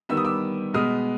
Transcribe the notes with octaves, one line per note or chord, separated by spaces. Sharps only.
D#3 G3 B3 E6
D#6
D6 E6
B2 G#3 B3 D#6 F6